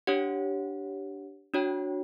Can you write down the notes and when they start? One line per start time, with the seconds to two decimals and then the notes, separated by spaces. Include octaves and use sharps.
0.07 D4 G4 C#5 F#5
1.54 D4 F#4 C#5 G5